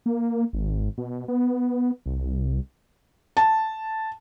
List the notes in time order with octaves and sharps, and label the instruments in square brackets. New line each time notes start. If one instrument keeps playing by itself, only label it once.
[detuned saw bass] A#3
G#1
B2
B3
C2
[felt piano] A5